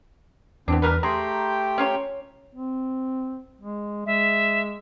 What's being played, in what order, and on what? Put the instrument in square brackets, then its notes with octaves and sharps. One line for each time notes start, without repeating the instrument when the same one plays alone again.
[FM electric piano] E2 [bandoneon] A2 C4 [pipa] B3 D4
[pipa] G3 A#4 B4 [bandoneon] D4
[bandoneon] A3 G4 G5 [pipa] G#4 [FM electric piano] A#5 C6
[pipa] C#4 F4 C#5
[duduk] C4
G#3
[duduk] G#3 [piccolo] E5